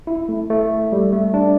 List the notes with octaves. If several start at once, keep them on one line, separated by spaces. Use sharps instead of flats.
E4
A3
A3
G3
A3
D4